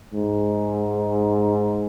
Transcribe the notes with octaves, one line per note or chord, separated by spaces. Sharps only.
G#2